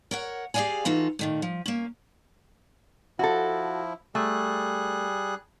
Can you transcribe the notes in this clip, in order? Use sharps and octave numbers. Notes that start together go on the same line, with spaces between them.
A#4 C#5 F#5
G4 G#4 C#5 D5 F5 G#5
E3 D#4 F4 F#4 A4
A#2 D#3 A3
F3
A#3 C#4
F3 E4 F#4 A4
G3 A3 G#4 F#6